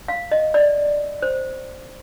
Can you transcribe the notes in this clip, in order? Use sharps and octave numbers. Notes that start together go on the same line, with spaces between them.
F5
D#5
D5
C5